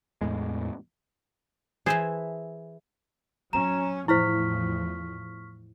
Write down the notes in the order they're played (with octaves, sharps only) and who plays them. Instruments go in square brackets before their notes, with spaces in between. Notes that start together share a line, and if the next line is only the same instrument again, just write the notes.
[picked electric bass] E2 A2 G#3
[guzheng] E3 E5 A5 [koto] G#4 C5
[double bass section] F#3 C#4 [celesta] A#5 E7
[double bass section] E2 A2 F3 [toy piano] E4 C5 [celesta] C#6 F6 B6